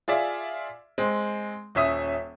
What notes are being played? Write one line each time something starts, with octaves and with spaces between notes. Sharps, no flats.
F4 G#4 D5 E5
G#3 C4
D#1 C#4 E5 D#6